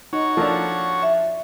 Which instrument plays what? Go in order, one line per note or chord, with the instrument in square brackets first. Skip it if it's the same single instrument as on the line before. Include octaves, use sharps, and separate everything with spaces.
[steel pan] D#4 [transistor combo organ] F#4 C#5
[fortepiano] F3 D4 [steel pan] A4 A#4 A#5
[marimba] E5